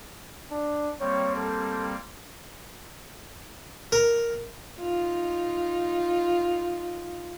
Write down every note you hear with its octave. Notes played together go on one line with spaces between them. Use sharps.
D4
G3 A#3 C4 C#5
A4
A#4
D#4 F4